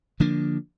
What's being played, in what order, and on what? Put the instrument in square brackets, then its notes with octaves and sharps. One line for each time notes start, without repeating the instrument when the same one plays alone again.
[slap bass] D3 F3 A#3 D4